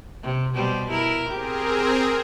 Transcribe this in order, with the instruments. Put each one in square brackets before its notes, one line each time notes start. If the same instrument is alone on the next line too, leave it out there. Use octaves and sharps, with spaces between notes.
[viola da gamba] C3
B2 G3 C5
E4 A#4
[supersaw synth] C4 G#4 A#4 [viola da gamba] G4